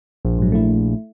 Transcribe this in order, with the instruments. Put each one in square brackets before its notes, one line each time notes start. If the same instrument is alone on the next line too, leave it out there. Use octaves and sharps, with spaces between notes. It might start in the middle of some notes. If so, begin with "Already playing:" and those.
[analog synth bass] A#1
[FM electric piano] G#2 F#3
A3 E4